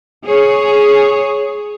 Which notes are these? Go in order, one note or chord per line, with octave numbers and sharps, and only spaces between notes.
G#4 C#5